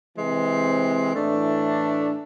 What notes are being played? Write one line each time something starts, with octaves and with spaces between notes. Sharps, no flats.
C3 E3 G#3 C4
A2 E3 A3 D4